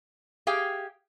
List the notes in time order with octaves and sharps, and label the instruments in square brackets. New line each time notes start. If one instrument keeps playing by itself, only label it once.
[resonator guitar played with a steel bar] G4 G#4 F5 G5